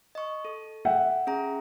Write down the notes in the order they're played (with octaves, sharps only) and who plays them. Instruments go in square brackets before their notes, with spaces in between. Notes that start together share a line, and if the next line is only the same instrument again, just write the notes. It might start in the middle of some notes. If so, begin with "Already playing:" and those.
[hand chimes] D#5 C#6
A4
[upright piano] E5 F#5 G5
[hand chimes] C#4 G#4 A#5